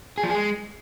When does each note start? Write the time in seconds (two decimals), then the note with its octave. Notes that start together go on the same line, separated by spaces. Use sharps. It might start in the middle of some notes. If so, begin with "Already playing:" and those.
0.18 G#4
0.23 F3
0.29 G#4
0.35 G#3